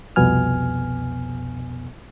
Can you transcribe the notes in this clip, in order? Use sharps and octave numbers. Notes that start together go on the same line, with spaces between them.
C2 F2 B2 B3 G#5 F6